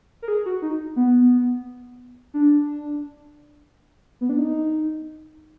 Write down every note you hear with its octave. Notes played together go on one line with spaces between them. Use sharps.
A#4
G#4
F#4
D#4
B3
D4
B3
D4
D#4